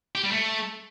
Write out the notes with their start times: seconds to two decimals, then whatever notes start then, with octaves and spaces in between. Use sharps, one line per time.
0.15 G4
0.23 G3
0.32 A3